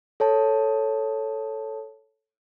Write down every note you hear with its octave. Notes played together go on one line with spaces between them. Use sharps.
A4 C#5 A5